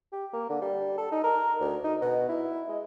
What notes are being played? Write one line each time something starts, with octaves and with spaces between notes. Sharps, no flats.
G4
A#3
D3
G3
A4
D#4
A#4
D2
D#4
B2
E4
G#3